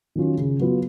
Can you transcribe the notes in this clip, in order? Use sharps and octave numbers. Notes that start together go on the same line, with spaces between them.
D#3 F#3 C#4 F4
C#3
F#3 B3 F4